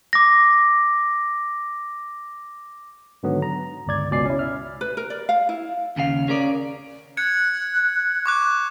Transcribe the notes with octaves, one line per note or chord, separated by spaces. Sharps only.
D6 A#6
G#2 D3 D#3 F#3 B3
A#5
G1 C#2 D5 G#6
G#1 C#2 B2 D5 G#5 C7
C#4 E4
E5 F6
B4
A#4
D5
F5
E4
D#2 C#3 G#4 F5
C#4 G#4 A#4 D5
F#6 G#6 C#7
C#6 D6 F#6